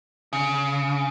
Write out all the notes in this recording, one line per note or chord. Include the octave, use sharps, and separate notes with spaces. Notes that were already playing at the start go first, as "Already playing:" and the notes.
C#3